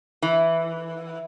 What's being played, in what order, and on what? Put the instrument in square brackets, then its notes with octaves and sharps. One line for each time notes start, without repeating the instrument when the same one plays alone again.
[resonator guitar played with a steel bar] E3